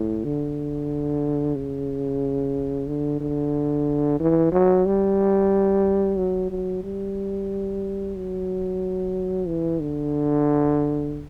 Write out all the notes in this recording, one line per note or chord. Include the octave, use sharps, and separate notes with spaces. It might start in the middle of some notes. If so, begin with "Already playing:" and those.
Already playing: A2
D3
C#3
D3
D3
E3
F#3
G3
F#3
F#3
G3
F#3
E3
D3